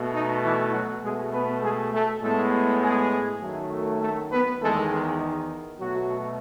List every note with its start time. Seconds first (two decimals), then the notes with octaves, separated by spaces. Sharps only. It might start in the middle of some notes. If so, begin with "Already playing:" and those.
Already playing: B2 A3
0.13 D#4
0.43 E3 E4
0.73 F#3 F#4
1.03 B2 G#3 A3 G#4
1.32 B3 B4
1.62 G#3 G#4
1.92 A3 A4
2.21 A2 G#3 A3 B3 A4
2.81 G#3 G#4
3.40 F#2 D#3 F#3 A3
4.00 A3 A4
4.31 B3 B4
4.60 E2 D#3 G#3 A3 A4
4.90 G#3 G#4
5.20 D#4
5.79 B2 F#3 A3 F#4